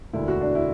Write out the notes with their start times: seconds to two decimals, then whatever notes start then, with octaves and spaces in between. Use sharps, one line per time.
0.13 E1 D2 D3 A#3 E4
0.28 F#4
0.41 D4
0.55 E4